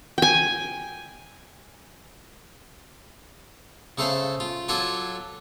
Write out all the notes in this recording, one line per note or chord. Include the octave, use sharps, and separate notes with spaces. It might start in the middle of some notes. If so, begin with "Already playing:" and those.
G5 G#5
C#3 A3 A4 C5 F5
F4
F#3 F4 A4 G#5 D6